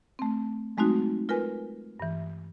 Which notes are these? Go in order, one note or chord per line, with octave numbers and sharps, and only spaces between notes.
A3 C4
F#3 G#3 A3 C4 D#4 F#4
F4 A#4 B4 G#5
G2 E3